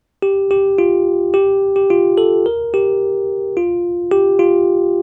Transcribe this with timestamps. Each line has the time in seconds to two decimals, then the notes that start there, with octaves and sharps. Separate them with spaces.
0.22 G4
0.51 G4
0.78 F4
1.34 G4
1.76 G4
1.90 F4
2.18 A4
2.46 A#4
2.74 G4
3.57 F4
4.12 G4
4.39 F4